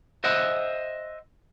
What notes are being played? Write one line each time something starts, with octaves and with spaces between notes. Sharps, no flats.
C5 D#5 E5 F#5